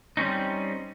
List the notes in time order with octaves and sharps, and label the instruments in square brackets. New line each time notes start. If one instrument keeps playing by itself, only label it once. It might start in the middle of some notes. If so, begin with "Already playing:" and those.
[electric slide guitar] G3 C4 C#4 D#4